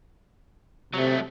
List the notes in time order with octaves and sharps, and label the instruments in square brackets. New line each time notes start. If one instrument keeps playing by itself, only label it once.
[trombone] C3 [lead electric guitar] F#3 A3